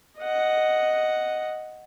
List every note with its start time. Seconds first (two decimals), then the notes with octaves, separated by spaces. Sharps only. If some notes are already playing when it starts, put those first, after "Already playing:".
0.19 D#5 F#5